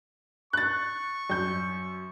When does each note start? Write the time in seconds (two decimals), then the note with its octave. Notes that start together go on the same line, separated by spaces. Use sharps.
0.53 C#6 F#6 A6
1.30 F#2 G6